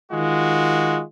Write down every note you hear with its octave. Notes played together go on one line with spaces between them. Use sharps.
D#3 G#3 F4 F#4